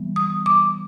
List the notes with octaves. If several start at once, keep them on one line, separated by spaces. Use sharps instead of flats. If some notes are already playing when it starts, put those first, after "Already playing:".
Already playing: E3 G3 B3
D#6
D6